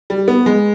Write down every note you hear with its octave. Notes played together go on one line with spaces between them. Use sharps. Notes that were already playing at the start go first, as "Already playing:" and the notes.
G3
B3
G#3